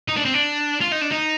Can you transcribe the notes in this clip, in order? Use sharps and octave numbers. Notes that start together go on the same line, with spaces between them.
D#4
D4
C4
D4
F4
D#4
D4
D#4